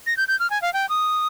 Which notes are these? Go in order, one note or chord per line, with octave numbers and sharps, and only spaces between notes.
A#6
G6
G6
F6
G#5
F5
G5
D#6